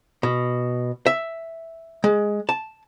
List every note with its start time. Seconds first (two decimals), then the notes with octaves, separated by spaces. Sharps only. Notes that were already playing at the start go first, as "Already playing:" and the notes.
0.23 B2
1.06 E5
2.04 G#3
2.49 A5